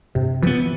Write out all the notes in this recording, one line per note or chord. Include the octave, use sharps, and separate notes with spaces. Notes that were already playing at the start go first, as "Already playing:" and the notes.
G2 C3
E3 F3 B3